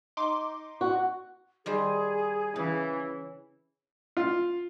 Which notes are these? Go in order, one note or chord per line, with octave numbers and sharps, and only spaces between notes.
D#4 C6 D6
F#4
D#3 G3 G#4 C5
C#3 E3
F4